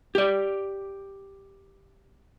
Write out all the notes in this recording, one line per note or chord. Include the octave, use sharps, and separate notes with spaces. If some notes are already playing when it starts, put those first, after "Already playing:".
G4 D5